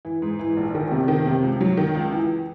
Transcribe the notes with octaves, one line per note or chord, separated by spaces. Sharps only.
E3
G#2
E3
A#1
D#3
C3
D#3
C3
C#2
F#3
D#3
C#2
E3